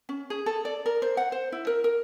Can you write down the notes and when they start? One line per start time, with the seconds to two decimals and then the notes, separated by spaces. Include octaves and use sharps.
0.09 C#4
0.30 G#4
0.46 A4
0.65 D5
0.86 A#4
1.02 C5
1.17 F#5
1.32 C5
1.52 E4
1.67 A#4
1.84 A#4